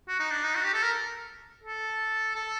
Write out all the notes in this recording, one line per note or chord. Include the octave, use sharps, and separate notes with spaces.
F#4
D#4
D4
D#4
F#4
G4
A4
A#4
A4
A4